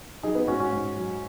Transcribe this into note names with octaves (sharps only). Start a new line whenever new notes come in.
F#3 D#4 G#4
B3 D#4
G#2 C#4 F#4
C#4 F#4
G#2
F#3